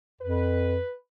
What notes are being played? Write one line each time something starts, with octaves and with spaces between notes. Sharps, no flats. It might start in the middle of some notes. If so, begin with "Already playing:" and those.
F2 B4